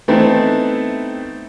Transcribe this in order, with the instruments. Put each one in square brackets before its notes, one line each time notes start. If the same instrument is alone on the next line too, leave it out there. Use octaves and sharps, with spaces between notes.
[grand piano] E3 A3 B3 C4 D#4 E4